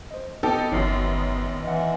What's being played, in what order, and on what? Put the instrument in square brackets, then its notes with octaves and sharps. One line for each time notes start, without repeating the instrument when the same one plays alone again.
[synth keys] C5 D#5
[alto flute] B3 [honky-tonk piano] D#4 G4 A4
[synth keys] G1 C#5 C7 [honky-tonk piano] F#2 D#3
[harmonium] E3 [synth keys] D#5 F#5